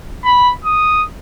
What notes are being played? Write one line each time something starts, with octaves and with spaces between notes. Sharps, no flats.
B5
D#6